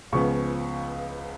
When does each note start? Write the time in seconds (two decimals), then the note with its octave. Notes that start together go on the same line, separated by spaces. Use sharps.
0.12 C#2 C#3 F3 B3 C#6